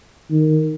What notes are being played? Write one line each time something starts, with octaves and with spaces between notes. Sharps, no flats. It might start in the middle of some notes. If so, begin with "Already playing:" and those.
D#3